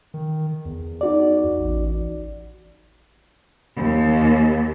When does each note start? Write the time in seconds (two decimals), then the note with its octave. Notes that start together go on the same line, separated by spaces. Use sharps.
0.14 D#3
0.65 E2
1.01 D#4 F#4 D5
1.59 A1
3.76 D#2